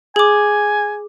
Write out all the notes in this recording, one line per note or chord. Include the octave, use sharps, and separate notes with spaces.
G#4 G#5 D6